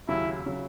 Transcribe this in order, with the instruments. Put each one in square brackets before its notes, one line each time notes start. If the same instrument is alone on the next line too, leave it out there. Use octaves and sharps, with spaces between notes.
[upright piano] D#2 C#3 F#3 C#4 [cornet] E4
[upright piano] C#3 F#3